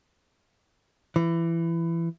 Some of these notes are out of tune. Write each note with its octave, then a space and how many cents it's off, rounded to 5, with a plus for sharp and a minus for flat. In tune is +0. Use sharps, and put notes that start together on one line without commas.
E3 +20